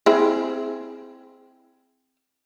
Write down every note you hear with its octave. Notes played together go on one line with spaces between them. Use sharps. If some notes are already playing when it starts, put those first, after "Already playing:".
C4 E4 G#4